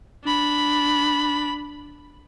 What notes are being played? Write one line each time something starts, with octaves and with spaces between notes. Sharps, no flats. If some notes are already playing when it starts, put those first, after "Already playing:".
D4 B5